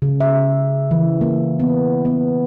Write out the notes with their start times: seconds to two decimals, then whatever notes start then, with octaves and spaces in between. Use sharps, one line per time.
0.02 C#3
0.20 E5
0.91 E3
1.21 A#3
1.60 B3
2.05 B3